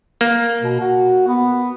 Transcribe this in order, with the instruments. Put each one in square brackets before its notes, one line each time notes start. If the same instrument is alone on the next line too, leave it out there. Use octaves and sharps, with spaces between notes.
[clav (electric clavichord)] A#3
[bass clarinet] B2
F#4
B3